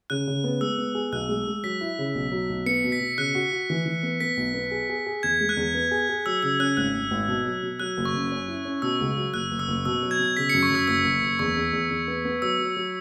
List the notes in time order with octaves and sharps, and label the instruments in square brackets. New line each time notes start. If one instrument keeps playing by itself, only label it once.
[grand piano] C#3 [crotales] F#6
[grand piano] C#3
B3
[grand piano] G#3 [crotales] E6
[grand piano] B3
G#4
[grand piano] B1 [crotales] F#6
[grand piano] G#3
G#3
[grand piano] F#3 [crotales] B6
[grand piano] E4
C#3
B1
F#3
B1
[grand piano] B3 [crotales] C#7
[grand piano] B2
[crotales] B6
[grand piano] B2
[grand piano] C#3 [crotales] F#6
[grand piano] F#4
F#4
E3
E3
B3
[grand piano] B3 [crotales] B6
[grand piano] B1
B3
G#4
G#4
G#4
[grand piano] E2 [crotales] G#6
[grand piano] G#3
[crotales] F#6
[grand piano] E2
B3
G#4
G#4
[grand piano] F#3 [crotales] E6
[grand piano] C#3 [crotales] E6
[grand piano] C#4 [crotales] F#6
[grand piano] G#1 [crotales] F#6
[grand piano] G#1
G#1
B2
F#3
B2
[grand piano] F#3 [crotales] F#6
[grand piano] F#1
[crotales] C#6
[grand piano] F#2
C#4
E4
C#4
[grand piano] B2 [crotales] E6
[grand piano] C#2
F#3
[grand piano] F#1 [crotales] F#6
[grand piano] F#1
[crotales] E6
[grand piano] F#1
[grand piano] B2 [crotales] E6
[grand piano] F#3
[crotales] G#6
[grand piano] B2
[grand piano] C#3 [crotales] B6
[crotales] C#7
[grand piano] F#2
[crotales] C#6
[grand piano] F#2 [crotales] E6
[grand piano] F#1 [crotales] E6
[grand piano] F#1
F#1
[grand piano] E2 [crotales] C#6
[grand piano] E2
E2
E2
B3
B3
[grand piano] F#3 [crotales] E6
[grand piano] F#3
F#3